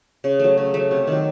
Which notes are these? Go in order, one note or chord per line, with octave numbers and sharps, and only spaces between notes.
C#3
F#3 A3
C#3
F#3 A3
C3
D#3 F#3